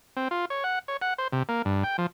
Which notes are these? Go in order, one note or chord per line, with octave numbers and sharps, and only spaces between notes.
C4
F4
C#5
F#5
C#5
F#5
C5
C3
A#3
G2
G5
F3